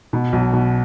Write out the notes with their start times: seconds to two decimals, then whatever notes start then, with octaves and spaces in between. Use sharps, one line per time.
0.13 B2
0.33 B1
0.53 B2